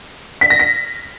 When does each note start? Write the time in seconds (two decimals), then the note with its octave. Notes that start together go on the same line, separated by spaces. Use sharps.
0.41 B6
0.50 A#6
0.59 B6